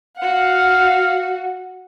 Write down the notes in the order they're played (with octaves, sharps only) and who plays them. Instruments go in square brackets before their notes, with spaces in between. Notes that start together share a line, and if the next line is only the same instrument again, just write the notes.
[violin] F#4 F#5 [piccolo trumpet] F5